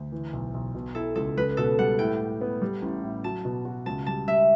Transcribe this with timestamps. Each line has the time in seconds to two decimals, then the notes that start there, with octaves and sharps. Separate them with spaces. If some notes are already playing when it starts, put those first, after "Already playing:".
Already playing: D2
0.12 E3
0.33 B1
0.54 B1
0.75 B2
0.95 E4 A4
1.15 C#2 A4
1.37 C#2 B4
1.57 B2 A4
1.79 G3 F#5
1.99 A2 G5
2.20 A2
2.41 B3
2.62 G3
2.82 A1
3.03 A2
3.24 F#3 A5
3.45 B2
3.65 F#4
3.86 C#2 A5
4.06 G3 A5
4.27 G3 E5